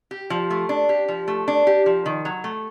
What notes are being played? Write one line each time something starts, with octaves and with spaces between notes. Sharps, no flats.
G4
F3
A3
D4
G4
F3
A3
D4
G4
F3
D#3
F#3
A3